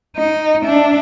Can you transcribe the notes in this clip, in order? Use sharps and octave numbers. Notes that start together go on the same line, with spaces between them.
D#4
D4 E5